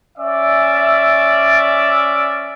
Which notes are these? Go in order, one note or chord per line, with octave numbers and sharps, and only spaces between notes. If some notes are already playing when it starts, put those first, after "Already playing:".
C#4 D5 E5